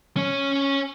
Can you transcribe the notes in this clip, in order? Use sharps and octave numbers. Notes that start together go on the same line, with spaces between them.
C#4 C#5